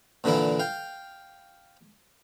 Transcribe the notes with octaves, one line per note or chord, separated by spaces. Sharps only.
A#2 D3 E3 A#3 E4
F5 G5